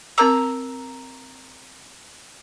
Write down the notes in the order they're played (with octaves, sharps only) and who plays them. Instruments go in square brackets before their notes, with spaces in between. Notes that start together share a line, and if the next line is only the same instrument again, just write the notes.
[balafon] C4 A#4 D6 [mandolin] A#5 E6